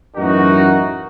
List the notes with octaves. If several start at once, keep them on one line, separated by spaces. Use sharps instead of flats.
A1 F#2 E3 D#4 F#4 A#4